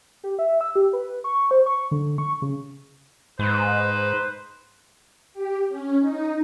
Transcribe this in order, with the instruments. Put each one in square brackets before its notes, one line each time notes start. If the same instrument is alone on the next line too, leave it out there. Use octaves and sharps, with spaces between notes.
[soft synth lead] G4
E5
E6
G4
B4
C#6
C5
C#6
D3
C#6
C#3
[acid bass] G#2 [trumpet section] D#4 B4 C5
[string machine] G4
C#4
D#4